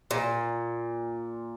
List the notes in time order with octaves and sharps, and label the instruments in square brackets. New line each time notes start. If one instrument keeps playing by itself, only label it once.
[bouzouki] A#2